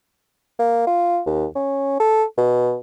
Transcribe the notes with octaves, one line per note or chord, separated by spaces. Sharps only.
A#3
F4
D#2
C#4
A4
B2